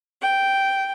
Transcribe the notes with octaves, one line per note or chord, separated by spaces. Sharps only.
G5